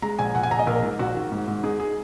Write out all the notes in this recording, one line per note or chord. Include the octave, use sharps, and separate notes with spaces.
G#3 A#5
A#1 G#5
A#1 F#5
G#5
A#1 A#5
D#5
A#1 A#4
G#2
A#1 F#4
D#3
G#2
G#2
D#4 G#4
G#4